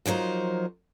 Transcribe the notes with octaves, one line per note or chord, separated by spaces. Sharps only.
F3 F#3 D#4 A#4 C5